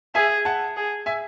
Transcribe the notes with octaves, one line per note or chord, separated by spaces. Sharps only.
G#4 E5 G#5
F#5 A5
G#4
E5 G#5